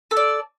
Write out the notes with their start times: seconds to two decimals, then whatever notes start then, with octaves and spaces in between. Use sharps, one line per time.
0.11 A4
0.17 D5